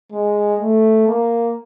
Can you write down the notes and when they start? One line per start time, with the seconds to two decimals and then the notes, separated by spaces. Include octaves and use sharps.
0.12 G#3
0.60 A3
1.08 A#3